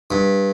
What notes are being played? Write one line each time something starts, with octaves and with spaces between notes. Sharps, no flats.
G2